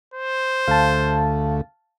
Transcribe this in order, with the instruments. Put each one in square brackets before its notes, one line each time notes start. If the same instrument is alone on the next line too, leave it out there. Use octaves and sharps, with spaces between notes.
[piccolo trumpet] C5
[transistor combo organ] D2 A3 [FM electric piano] F5 A5